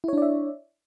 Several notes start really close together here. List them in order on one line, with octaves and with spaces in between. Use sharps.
E4 C#5 D4 D5 E5